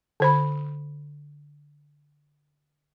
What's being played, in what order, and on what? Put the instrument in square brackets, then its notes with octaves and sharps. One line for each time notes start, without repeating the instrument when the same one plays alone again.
[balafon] D3 C5 B5